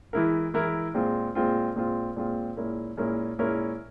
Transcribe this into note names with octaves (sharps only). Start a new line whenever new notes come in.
E3 G#3 E4 A#4
E3 G#3 E4 A#4
A#2 G#3 C4 F4
A#2 G#3 C4 F4
A#2 G#3 C4 F4
A#2 G#3 C4 F4
A#2 G#3 C#4 E4 A#4
A#2 G#3 C#4 E4 A#4
A#2 G#3 C#4 E4 A#4